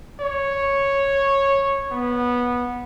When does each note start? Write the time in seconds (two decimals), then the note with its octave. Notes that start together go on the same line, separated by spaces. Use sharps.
0.21 C#5
1.92 B3